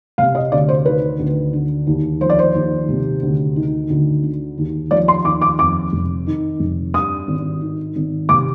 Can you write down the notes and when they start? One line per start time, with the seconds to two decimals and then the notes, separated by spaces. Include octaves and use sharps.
0.18 C3 F5
0.35 D#5
0.52 D2 D5
0.69 C5
0.85 D#3 B4
1.19 D2
1.53 D3
1.87 D#2
2.21 F3 C5
2.30 D5
2.39 C5
2.55 D#2
2.89 C3
3.22 D2
3.56 D#3
3.90 D2
4.23 D3
4.58 D#2
4.91 F3 D5
5.08 C6
5.25 D#2 D6
5.42 D6
5.59 F2 D6
5.93 F1
6.27 D#3
6.60 F1
6.94 G2 D#6
7.28 G#1
7.61 D#3
7.96 G#1
8.29 C3 D6